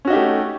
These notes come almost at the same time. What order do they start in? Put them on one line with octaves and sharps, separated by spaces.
C#4 F#4 D#4 G4 A3